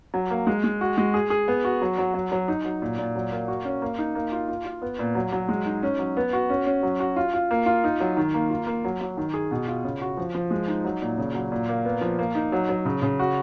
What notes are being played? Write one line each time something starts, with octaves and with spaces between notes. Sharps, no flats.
F#3
A#3
G#3
G#3
F#4
G#3
G#4
G#4
B3
F#4
F#3
F#3
F#3
F#3
D#4
F#3
A#2
A#2
F#3
A#3
F#4
C#4
A#3
D#4
A#3
F4
F4
F4
B3
A#2
F#3
F#3
G#3
D#4
C#4
F#3
B3
F#4
C#4
C#4
F#3
F#4
F4
F4
A#3
F4
D#4
F#3
D#3
A#3
F4
A#3
F#3
F#3
D#3
G#4
B2
F4
C#3
F#4
F3
F3
G#3
D#4
F#3
A#2
C#3
F#3
A#2
A#3
B3
F3
A#3
D#4
F#3
F#3
C#3
C#3
F#4